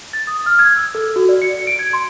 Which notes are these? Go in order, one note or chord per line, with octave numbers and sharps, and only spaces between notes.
A6
D#6
F6
G#6
E6
A4
F#4
D5
C#7
D7
G#6
C6